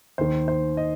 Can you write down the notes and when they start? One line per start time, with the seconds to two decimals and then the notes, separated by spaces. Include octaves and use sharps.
0.18 D#2 D#3 C5
0.48 C5
0.77 D#5